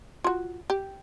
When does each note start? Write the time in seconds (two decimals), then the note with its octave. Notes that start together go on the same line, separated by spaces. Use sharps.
0.24 F4 F#4
0.70 G4